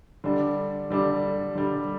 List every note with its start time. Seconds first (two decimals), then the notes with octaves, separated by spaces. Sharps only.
0.24 D3 G3 D4
0.90 D3 G3 D4
1.55 D3 G3 D4